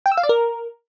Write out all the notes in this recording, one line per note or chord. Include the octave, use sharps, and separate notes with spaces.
G5
E6
F5
D5
A#4